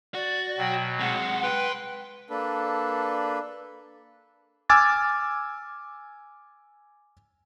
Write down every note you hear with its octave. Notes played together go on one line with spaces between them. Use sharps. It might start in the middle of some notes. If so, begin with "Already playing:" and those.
F#4 D5
B2 F#3 G5
C3 G#3 F#5
B4 G5 C6
A#3 D4 A4 B4
G#5 D6 E6 F6 G#6 A6